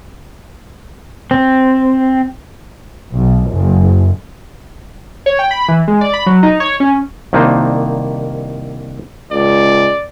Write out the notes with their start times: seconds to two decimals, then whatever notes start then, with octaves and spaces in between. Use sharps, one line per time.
1.31 C4
3.13 B1
3.50 F#1
5.26 C#5
5.39 G5
5.51 B5
5.68 E3
5.88 G#3
6.01 D5
6.13 B5
6.26 F#3
6.43 D#4
6.60 C#5
6.80 C#4
7.33 C2 D#3 A#3 D4 D#4 C5
9.31 C#2 D5